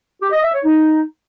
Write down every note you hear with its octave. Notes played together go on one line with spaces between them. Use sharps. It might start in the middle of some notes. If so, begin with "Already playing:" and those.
G4
D#5
E5
C#5
D#4